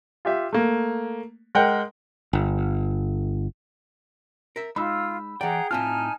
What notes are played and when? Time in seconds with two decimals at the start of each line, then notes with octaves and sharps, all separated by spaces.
0.25 F4 G4 E5
0.53 A3 A#3
1.55 G#3 A#4 F#5 G5
2.33 G1
4.56 A#4 E5
4.76 G#3 D#4 F4 B5 E6
5.41 E3 G#4 D5 F#5 G5 A#5
5.71 A2 C4 D#4 F4 G#5 A5 F6